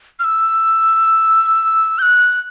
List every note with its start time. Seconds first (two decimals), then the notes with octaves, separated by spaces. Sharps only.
0.19 F6
0.24 E6
1.99 G6
2.02 F#6